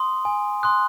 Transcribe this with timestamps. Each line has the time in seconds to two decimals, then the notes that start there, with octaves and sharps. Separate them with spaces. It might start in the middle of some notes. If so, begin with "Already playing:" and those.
Already playing: C6 D#6
0.25 G#5
0.63 C6 D#6 F#6